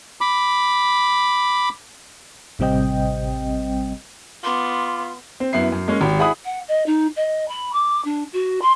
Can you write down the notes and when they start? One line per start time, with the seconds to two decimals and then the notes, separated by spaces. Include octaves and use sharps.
0.21 B5 D6
2.59 A1 C3 G3 C4 D#5 G5
4.44 B3 F4 C6 D6
5.40 C4
5.53 F#2 B3 E4 C7
5.72 F#2
5.88 G#3 A#3 C#4
6.01 G#1 G4 G5
6.19 E4 G#4 F#5 B5 D#6
6.44 F#5
6.68 D#5
6.86 D#4
7.16 D#5
7.48 B5
7.73 D6
8.04 D4
8.32 F#4
8.62 C6